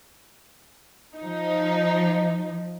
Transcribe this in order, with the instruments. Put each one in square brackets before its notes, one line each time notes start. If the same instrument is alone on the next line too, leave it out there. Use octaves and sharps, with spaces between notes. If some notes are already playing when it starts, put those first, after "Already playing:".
[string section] F3 D#4